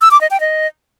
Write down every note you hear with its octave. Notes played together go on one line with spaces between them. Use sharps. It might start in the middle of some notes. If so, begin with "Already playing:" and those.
E6
D6
D#5
G5
D#5